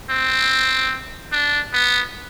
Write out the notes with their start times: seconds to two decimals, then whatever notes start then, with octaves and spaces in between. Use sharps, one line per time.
0.10 C4
1.32 D4
1.73 B3